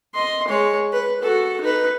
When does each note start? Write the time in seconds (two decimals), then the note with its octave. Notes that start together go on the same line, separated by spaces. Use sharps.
0.14 D#5 C6
0.48 G#3 C#5
0.93 B4
1.22 F#4 A4
1.61 D#4 B4